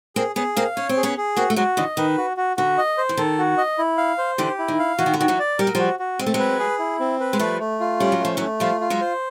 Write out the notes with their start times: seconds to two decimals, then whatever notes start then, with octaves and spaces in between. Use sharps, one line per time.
0.16 A#3 C4 G#4
0.36 B3 C#4 G#4
0.56 A#3 C4 F5
0.77 C#4 C#5
0.89 C4
0.97 G#4
1.03 B3 C#4
1.17 G#4
1.36 A#3 C4 F#4
1.50 A3
1.56 F#3 G#3 F#4
1.77 D3 E3 D#5
1.97 D#3 B4
2.18 F#4
2.37 F#4
2.57 D3 F#4
2.78 D#5
2.98 C5
3.09 E3
3.17 D#3 A4
3.38 F#4
3.58 D#5
3.79 E4
3.97 F5
4.18 C5
4.38 D3 E3 G4
4.58 E4
4.68 D#3
4.79 F5
4.99 E3 F#4
5.06 D#3
5.14 D3
5.19 D#3 F#4
5.28 E3 F#3
5.39 D5
5.59 G3 A#4
5.67 F#3
5.75 F3 G3 F#4
5.99 F#4
6.19 G#3 C4
6.26 A3
6.34 F#3 G#3 B4
6.59 G#4
6.79 E4
7.00 C4
7.20 B4
7.33 G#3
7.39 F3 G3 A3
7.60 A3
7.80 F4
7.99 G3 C#4
8.12 F#3
8.20 F3 A3
8.37 E3 F#3
8.40 A3
8.60 F3 G3 F4
8.81 F4
8.90 F#3 G#3
9.01 C5